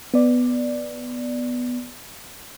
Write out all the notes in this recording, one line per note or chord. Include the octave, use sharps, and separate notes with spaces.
B3 D5